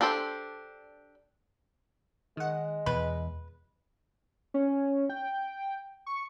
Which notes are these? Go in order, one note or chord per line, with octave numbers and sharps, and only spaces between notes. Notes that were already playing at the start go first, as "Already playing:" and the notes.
D4 G4 A4 C5
D#3 G#3 F#5
E2 B2 B4
C#4
G5
C#6